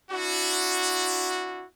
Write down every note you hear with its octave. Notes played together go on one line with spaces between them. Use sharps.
D4 E4 F#4